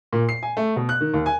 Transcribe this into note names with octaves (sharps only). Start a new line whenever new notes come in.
A#2
C7
G#5
A3
B2
F#6
D#3
D#2
G#5